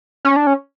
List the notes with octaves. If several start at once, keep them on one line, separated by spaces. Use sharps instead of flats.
C#4
D4
C#4